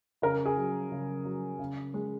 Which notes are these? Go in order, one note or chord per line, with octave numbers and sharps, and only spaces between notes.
C#3 A#4
G#4
F#3
C#3
F#3
C#3
G#3